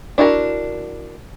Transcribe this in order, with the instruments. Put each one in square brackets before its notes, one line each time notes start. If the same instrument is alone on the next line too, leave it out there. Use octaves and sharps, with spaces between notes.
[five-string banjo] D4 E4 F#4 G#4 A#4